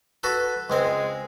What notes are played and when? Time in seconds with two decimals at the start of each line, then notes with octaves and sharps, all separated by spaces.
0.23 F#4 A4 B4
0.70 C#2 G#3 C4 G#5